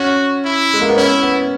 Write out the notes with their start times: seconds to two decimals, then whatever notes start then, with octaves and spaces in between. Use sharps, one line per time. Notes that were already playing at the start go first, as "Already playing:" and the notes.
Already playing: C#4 F#4
0.45 E4
0.74 G#3
0.81 A#3
0.89 B3
0.97 C#4 E4
1.23 B3